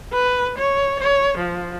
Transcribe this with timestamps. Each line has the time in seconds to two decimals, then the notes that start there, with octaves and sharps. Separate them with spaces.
0.13 B4
0.58 C#5
0.99 C#5
1.38 F3